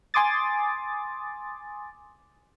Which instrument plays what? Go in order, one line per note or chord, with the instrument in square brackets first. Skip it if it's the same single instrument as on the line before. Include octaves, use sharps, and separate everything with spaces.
[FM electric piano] G#5 C6 D6 D#6 A6